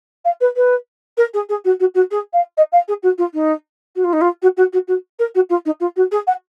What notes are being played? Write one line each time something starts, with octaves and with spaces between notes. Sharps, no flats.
F5
B4
B4
A#4
G#4
G#4
F#4
F#4
F#4
G#4
F5
D#5
F5
G#4
F#4
F4
D#4
F#4
F4
D#4
F4
F#4
F#4
F#4
F#4
A#4
F#4
F4
D#4
F4
F#4
G#4
F#5